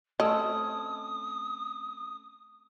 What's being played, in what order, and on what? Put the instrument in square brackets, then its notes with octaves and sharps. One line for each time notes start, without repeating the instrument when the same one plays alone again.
[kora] A3 C4 C#4 [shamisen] D#5 [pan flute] D#6